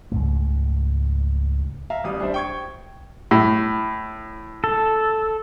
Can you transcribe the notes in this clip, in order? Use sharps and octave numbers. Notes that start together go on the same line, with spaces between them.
C#2 G#2 A3
E5 F5 A#5
A1 G3 D#6
G3 D4 C5 E5
G5 C#6 G#6
A2
A4